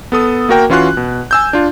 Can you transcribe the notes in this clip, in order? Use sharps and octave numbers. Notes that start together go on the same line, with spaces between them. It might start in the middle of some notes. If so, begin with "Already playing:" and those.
B3 A4 D#6
A#3 F#4 A#4 G5
E3 C#4 F4 F#4 C6 F#6
B2
G#5 E6 G6
D4 F4